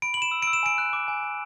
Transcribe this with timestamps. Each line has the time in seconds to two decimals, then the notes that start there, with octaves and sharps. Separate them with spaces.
0.02 B5 D7
0.14 F#7
0.17 B5 E7
0.31 E6
0.42 E6 D7
0.53 E7
0.63 G#5 D7
0.78 F#6
0.93 D6
1.08 G#5
1.23 G#5